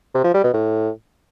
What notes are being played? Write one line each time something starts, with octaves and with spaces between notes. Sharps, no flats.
C3
F3
G3
B2
A2